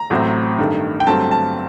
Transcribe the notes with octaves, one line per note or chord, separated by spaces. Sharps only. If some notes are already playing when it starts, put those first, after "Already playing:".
Already playing: A#5
A1 A2 F#3 C4
G2 D#3 A3
G5
G1 G2 F#3 A3 C4 A5
A5